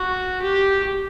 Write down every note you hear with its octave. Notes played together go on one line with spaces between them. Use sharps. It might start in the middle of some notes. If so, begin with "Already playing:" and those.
Already playing: F#4
G4